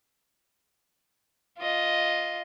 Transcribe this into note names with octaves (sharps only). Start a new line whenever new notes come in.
F4 D#5